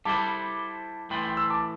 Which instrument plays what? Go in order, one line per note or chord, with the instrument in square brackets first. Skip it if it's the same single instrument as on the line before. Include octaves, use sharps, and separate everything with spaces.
[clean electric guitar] G3 E4 A4 C5 [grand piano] A5 D6
[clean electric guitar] A2 E3 A3 [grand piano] G5 C6
[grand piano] G5 C6
C6 E6
A5 D6